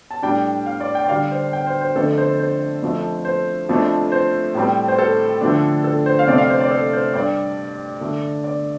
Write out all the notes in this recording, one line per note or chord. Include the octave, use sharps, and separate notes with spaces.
A5
A2 G3 D4 G5
F5
D5
G5
D5
D3 G3 D4 F5
C5
G5
C5
C5
F2 D3 A3 D4 A4
C5
C5
F2 F3 A3
C5
F2 F3 A3 D4
C5
A2 G3 C4
C5
A4
D3 F3 A3 D4
A4
C5
F5
F2 C3 A3 C4 D5
F5
C5
D5
A4
C5
G2 G3 D4 D5
D3 A3 D4
D5